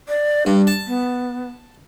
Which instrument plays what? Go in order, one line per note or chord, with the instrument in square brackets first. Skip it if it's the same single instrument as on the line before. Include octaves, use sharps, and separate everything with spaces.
[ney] D5
[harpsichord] G2 [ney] D4
[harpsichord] A5
[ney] B3